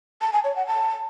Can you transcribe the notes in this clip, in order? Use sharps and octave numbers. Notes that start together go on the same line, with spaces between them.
A5
G#5
C#5
F#5
A5